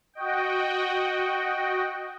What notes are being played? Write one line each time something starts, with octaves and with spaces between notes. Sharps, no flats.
F#4 D#5 G5